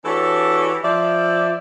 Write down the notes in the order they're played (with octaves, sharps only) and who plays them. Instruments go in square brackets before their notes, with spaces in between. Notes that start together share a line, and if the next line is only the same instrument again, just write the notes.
[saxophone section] E3 D4 F#4 G4 A4 C#5
F3 D5 E5